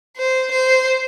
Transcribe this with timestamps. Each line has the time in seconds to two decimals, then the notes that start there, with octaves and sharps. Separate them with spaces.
0.18 C5
0.52 C5